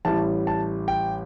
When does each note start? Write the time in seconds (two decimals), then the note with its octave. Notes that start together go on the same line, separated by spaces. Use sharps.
0.05 A1 A2 G3 A5
0.47 A5
0.88 G5